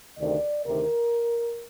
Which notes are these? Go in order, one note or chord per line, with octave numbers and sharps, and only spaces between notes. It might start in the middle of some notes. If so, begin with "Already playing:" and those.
D2 C3 D#3 D5
D2 C3 D#3 A#4